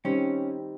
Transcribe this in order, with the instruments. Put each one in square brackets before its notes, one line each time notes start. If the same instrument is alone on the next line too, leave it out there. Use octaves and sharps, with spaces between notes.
[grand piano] D#3 G3 C4 [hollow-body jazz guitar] C#4